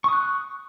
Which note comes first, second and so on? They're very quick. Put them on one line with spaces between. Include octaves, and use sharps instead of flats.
C#6 D#6 F#6